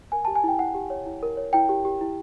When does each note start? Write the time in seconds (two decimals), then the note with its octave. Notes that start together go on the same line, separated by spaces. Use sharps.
0.12 A#4 G#5
0.25 G4 A5
0.35 G#5
0.44 E4 G5
0.59 E4 F#5
0.74 G4
0.90 C#5
1.06 E4
1.23 A#4
1.37 C#5
1.53 E4 G5
1.69 G4
1.85 G4
2.01 E4